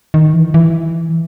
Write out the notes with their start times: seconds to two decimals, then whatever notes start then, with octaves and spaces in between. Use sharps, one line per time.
0.14 D#3
0.34 E3
0.54 E3